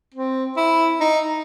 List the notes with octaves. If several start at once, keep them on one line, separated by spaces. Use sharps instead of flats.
C4
E4
D#4